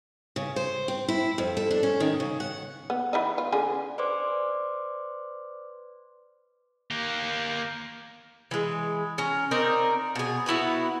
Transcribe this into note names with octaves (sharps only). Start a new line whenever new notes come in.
C#3
C5
C4
E4
F2
A4
D4
C#4
D#3
C#3
F#5
B3
E3 B3 D#4
F4
D3 C#4 G#4
B4 C5 D5 C6 D6
A#3 G4
E3 G#3
C#4 A#5
C4 D#4 A#4 D5
B2 G#4
B3 E4 F#4 B4